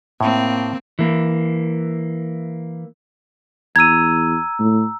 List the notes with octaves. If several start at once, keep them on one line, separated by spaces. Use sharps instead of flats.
A2 A#3 C4
E3 A#3
E2 A#5 E6 G#6 D#7
A2